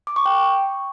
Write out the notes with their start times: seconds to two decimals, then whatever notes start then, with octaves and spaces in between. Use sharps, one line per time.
0.07 D6
0.16 C#6
0.26 G5